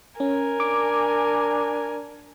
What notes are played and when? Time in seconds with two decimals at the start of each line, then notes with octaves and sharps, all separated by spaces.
0.20 C#4 A#4 G#5
0.60 D4 D6